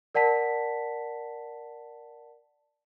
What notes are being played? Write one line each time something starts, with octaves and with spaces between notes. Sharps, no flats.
A#4 D5 F#5 A5 B6